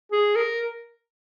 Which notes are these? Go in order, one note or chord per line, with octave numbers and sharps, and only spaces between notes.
G#4
A#4